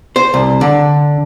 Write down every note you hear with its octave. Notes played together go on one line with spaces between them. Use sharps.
C5
C2
D3